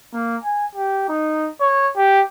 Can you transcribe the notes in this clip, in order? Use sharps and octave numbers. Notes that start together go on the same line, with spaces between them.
A#3
G#5
G4
D#4
C#5
G4